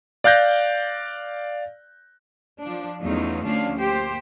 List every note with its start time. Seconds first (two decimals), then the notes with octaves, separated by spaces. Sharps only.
0.24 D5 F5 F#6 G6 A#6
2.62 F3 D4
3.00 E2 F#3 A3 C#4 D#4 F4
3.44 D2 F3 C#4 D4 F5
3.77 A#3 G4 C5